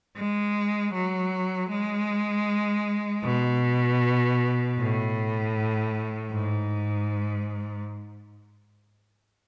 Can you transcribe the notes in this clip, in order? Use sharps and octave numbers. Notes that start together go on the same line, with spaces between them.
G#3
F#3
G#3
B2
A2
G#2